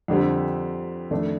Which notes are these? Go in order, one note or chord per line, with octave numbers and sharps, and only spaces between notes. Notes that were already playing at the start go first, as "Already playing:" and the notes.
F2 D3 G3 C4
F2 D#3 A3 D4